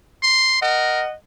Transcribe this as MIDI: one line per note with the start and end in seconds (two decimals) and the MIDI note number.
0.23 0.59 84
0.62 1.03 70
0.62 1.11 75
0.62 1.11 78